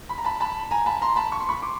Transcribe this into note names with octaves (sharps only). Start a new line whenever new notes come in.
B5
A#5
A5 B5
A5 B5
G#5 A#5
A5 B5
A#5 C6
A5 B5
C#6
C6
B5 C#6
C6 D6